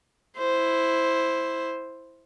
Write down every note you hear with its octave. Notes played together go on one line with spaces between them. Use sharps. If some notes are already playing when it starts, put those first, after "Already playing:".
E4 C5